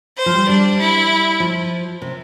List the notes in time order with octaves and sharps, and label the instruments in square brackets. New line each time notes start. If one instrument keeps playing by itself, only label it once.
[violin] C5
[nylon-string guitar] F3
G3
[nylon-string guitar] G3 [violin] D4
[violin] E4
[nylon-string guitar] F3
C3